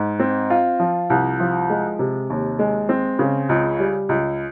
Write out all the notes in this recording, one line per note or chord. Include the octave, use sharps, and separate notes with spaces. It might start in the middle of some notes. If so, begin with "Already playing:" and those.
Already playing: G#2
C4
F4
F3
C2
F3
G#3
C3
D#2
G#3
C4
C#3
C#2
G3
C#2